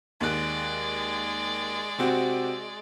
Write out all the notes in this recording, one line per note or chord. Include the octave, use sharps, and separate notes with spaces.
D#2 G#3 D5 F#6
C3 C4 F#4